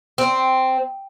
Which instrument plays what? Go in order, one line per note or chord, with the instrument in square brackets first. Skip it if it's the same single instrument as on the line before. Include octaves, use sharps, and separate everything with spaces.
[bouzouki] C4